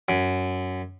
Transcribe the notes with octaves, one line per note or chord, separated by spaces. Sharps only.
F#2